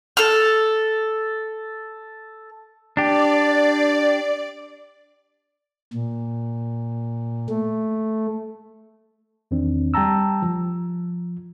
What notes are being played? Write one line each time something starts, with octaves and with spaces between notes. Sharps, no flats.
A4 F6
D4 G4 D5
A#2
A3
E2 D#3 C4 D4
G3 G5 A5 A#5 E6
F3